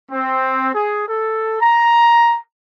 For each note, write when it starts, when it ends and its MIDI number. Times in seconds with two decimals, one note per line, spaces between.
0.11 0.69 60
0.75 1.07 68
1.08 1.58 69
1.60 2.39 82